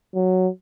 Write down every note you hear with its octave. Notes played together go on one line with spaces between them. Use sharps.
F#3